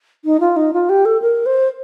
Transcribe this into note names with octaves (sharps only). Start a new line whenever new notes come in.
D#4
F4
D#4
F4
G4
A4
A#4
C5